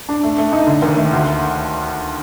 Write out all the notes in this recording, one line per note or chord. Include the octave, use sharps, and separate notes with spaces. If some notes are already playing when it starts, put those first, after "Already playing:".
D4
A3
A3
D#4
D3
D#2
A3
D2